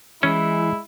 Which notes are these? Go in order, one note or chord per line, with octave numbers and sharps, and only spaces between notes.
E3 G#3 C#4 E4